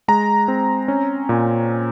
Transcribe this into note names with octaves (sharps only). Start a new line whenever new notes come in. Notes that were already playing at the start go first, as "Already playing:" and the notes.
G#3 A#5
C4
C#4
A#2